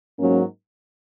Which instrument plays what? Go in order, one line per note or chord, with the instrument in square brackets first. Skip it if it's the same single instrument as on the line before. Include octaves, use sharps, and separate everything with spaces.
[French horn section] G#2 F#3 A#3 C#4